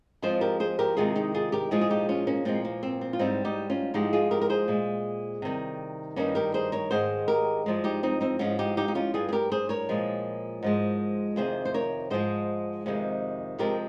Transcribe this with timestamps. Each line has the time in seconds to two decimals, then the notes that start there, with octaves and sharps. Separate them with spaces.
0.22 F2 C#3 F3 G#3 G#4 C5
0.41 G4 A#4
0.60 G#4 C5
0.79 G4 A#4
0.97 C3 D#3 G#3 F4 G#4
1.16 D#4 G4
1.34 F4 G#4
1.52 G4 A#4
1.71 A#2 F3 G#3 F4 G#4
1.81 G#4
1.90 D#4 G4
2.09 C#4 F4
2.27 A#3 C#4
2.45 A#2 F3 G#3 C4
2.65 A#3
2.83 C4
3.01 C4
3.13 F4
3.19 G#2 G3 C4 D#4
3.45 D#4 G4
3.70 C#4 F4
3.94 G#2 F3 G#3 D#4 G4
4.13 F4 G#4
4.31 G4 A#4
4.41 A#4
4.50 G#4 C5
4.68 A#2 G#3
5.42 C3 D#3 G3
6.16 G2 D#3 G3 A#3 C#4
6.35 G4 A#4
6.54 G#4 C5
6.72 A#4 C#5
6.91 G#2 D#3 G#3 G#4 C5
7.28 G4 A#4
7.66 G2 F3 G#3
7.84 D#4 G4
8.03 C4 D#4
8.21 C4 D#4
8.39 G#2 F3 G#3 C#4 F4
8.59 D#4 G4
8.77 D#4 G4
8.88 D#4
8.95 C#4 F4
9.14 G2 G3 F4 G#4
9.29 G#4
9.32 G4 A#4
9.52 G#4 C5
9.69 A#4 C#5
9.89 A#2 F3 G#3
10.63 G#2 F3 G#3
11.36 F2 C3 D#3 G#4 C5
11.65 C5
11.74 A#4 C#5
12.10 G#2 F3 G#3 G#4 C5
12.86 F2 C3 D#3 G#3
13.59 C3 F3 G#3 G4 A#4